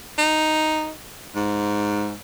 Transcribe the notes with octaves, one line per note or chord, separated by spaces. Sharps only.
D#4
G#2